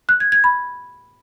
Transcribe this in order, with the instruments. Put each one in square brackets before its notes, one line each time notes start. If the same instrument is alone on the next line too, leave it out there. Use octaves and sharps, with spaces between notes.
[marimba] F#6
G#6
G#6
B5